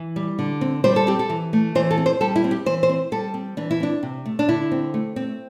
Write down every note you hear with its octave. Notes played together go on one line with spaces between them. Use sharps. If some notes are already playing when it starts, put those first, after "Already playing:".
Already playing: E3
G3
D3
C4
G3 C5
A4
C4 G4
A4
E3
A3
E3 C5
A4
C4
C5
G3 A4
E4
C4
G4
E3 C5
C5
C4
G3 A4
C4
E3 D4
E4
C4 D4
C3
A3
D4
D3 E4
C4
A3
C4